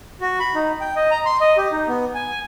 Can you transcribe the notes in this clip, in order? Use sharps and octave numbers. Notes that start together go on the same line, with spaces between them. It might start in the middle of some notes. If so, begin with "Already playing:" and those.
F#4
B5
D#4
G5
D#5
A#5
C6
D#5
G4
D#4
B3
G#5